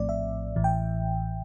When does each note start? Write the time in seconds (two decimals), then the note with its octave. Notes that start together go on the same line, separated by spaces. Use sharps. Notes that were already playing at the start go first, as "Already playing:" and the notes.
Already playing: A#1 A2 F3 A3 C4 D5
0.09 E5
0.56 A1 A2 E3
0.64 G5